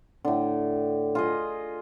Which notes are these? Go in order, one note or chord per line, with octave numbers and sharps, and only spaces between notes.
A2 D3
F4 G#4 D#5